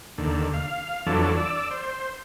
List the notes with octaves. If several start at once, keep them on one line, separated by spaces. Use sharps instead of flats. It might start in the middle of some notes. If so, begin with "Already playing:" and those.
D#2 D3
F5
F2 E3 F#3 D4 A4
D5 E6
C5